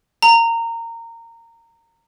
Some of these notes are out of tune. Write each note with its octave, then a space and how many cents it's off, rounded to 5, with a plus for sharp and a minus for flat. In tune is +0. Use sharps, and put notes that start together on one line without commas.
A#5 -20